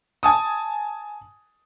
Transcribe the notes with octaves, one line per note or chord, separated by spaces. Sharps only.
G#5 A5 D#6